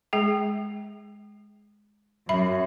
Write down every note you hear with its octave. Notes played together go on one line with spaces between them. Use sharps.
G#3 G#4 G5
F#2 E5 B5